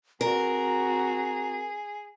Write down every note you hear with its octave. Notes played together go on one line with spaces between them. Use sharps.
C4 F#4 G#4 A#4 A#5